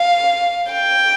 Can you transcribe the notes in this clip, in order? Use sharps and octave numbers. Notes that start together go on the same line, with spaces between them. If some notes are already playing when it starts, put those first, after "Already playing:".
Already playing: F5
G5